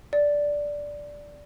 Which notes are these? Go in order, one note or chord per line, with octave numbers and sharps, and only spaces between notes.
D5